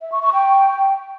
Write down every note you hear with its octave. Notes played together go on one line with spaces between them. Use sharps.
E5
C#6
C#6
G5